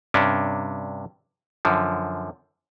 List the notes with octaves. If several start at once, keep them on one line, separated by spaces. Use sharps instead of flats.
G2 C3 C#4 D4
F#2 D3 F3